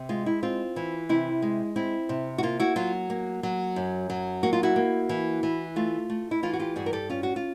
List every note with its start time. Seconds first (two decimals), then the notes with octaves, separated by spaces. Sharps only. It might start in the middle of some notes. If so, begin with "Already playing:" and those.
Already playing: C3
0.09 G#3 F4
0.26 E4
0.43 C4 F4
0.76 E3
1.09 C3 E4
1.42 G#3
1.76 C4 E4
2.09 C3
2.38 F#4
2.43 A#3 F4
2.60 E4 F#4
2.76 F#3 F4
3.10 A#3
3.43 F#3
3.76 F#2
4.10 F#3
4.43 A#3 F#4
4.53 F4
4.63 E4 F#4
4.76 A#3
5.09 E3
5.43 E3
5.76 A3 F4
6.10 A3
6.31 E4
6.43 E3 F4
6.53 F#4
6.59 F4 G4
6.76 G2 F#4 G#4
6.86 A#4
6.93 G4 A4
7.09 C#4 F4
7.23 F#4
7.36 F4